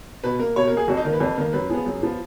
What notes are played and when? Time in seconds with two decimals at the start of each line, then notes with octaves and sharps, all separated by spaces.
0.24 B2 B4
0.39 A#3 A#4
0.56 B2 C#5
0.67 A#4
0.72 A#3 G#4
0.88 F2 F#4
0.97 D#4
1.04 D#3 A#3 A#4
1.13 B4
1.20 F2
1.37 D#3 A#3
1.53 F#2 B4
1.70 F3 B3 G#4
1.86 F#2
2.03 F3 B3